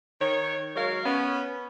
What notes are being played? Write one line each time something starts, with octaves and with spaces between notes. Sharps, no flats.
D#3 C#5
F#3 G#3 A#4 C#5 F5
B3 C#4